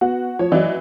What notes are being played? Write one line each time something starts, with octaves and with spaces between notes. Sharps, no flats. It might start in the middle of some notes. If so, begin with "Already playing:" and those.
B3 F#4
F3 C#5
E3 F#3 D5 D#5